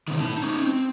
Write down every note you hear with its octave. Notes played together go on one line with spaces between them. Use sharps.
B2 D#3
A2 A5
C#4 D#4
C4